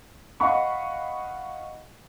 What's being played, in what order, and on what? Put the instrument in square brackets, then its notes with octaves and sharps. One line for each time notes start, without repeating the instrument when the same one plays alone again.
[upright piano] D#5 F5 F#5 B5 C#6